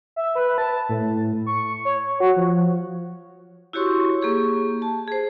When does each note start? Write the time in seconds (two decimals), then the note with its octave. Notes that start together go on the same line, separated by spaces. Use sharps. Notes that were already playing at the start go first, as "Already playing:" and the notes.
0.16 E5
0.35 B4
0.58 A5
0.89 A2
1.46 C#6
1.85 C#5
2.20 F#4
2.36 F3
3.73 E4 F#4 G4 C#5 C6 C#6
4.22 A#3 G4 G#4 C#6
4.82 A5
5.08 G#4 C5